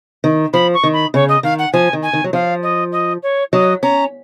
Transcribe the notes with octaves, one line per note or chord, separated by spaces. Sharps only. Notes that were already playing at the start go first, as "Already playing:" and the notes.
D#3
F3 B5
C#6
D#3
B5
C#3 C#5
D#5
D#3 F5
F#5
F3 G#5
D#3
G#5
D#3
F#3
F3 F5
D#5
D#5
C#5
F#3 D#5
C#4 A#5